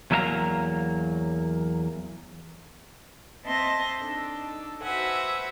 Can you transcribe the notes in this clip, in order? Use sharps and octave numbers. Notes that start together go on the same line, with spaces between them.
E2 F#3 A#3 E5 F5 A#5
C4 D#5 E5 A5 C6 A#6
D4 D#4 A4
F#4 B4 C5 E5 F#5 G#5